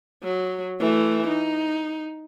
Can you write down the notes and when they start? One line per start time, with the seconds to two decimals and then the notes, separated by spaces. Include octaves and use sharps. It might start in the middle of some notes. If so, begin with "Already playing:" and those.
0.24 F#3
0.80 E3 A3
1.28 D#4